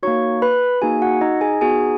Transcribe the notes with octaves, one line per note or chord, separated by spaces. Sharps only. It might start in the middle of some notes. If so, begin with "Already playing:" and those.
A#3 D#4 F#4 C#5 C#6
B4 B5
A#3 D#4 F#4 G#4 G#5
F#4 F#5
D#4 D#5
G#4 G#5
B3 D#4 F#4 G#4 G#5